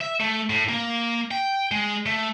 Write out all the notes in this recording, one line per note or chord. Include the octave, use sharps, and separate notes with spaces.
E5
A3
A2
A#3
G5
G#3
A3